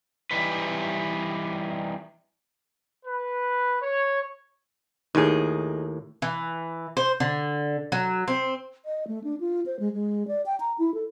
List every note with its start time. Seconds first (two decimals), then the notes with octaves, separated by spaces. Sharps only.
0.31 E3 G3 D#4 B4
3.06 B4
3.82 C#5
5.15 D#2 A2 D#4 G#4
6.22 E3
6.97 C5
7.20 D3
7.92 F#3
8.28 C4
8.85 D#5
9.08 A3
9.24 D4
9.40 F4
9.66 C5
9.80 G#3
9.94 G#3
10.28 D5
10.46 G5
10.60 A#5
10.79 E4
10.94 A4